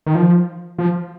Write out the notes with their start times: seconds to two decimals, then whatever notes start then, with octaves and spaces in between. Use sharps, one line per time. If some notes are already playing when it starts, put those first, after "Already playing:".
0.06 D#3
0.15 F3
0.78 F3